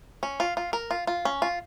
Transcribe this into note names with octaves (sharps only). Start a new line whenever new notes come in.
C#4
F4
F4
A#4
F4
F4
C#4
F4